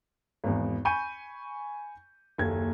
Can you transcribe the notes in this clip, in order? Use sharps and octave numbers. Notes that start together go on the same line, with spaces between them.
G#1 E2
G#5 B5 C#6 G6 D#7
F#1 D#2 A4 G#6